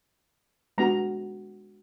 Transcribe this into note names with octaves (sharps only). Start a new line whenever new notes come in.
G#3 B3 D4 F#4 A#5